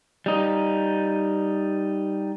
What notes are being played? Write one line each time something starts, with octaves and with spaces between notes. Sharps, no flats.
G3 D#4